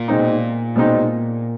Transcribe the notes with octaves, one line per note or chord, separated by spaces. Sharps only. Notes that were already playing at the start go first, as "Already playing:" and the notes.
Already playing: A#2
B2 G#3 C4 D#4
B2 G#3 C4 D#4